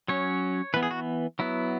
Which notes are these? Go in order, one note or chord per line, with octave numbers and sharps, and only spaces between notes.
F#3 C#4 C#5
E3 B3 B4
G#4
F#4
F#3 B3 E4